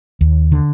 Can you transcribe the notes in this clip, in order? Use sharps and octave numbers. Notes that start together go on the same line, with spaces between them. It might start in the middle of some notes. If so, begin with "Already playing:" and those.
D#2
D3